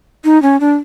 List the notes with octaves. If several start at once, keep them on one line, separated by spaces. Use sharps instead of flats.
D#4
C#4
D4